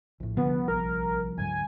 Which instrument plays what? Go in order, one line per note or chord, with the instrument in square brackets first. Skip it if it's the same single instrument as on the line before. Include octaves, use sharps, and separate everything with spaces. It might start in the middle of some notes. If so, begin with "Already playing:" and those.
[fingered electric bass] A#1 A2
[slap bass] C2 F3 [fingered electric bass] D3 [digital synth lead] B3
[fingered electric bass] A#1 [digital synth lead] A#4
[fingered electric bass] D2 G#2 F#3 [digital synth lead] G#5